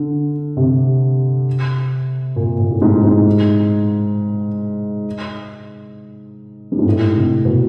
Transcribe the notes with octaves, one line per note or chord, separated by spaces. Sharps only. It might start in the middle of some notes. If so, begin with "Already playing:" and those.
Already playing: D3
C3
A#2
A#2
A2
G#2
G#2
G2
G#2
A2
C3
B2